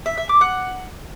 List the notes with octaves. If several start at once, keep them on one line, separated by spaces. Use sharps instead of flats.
E5
E5
D6
F#5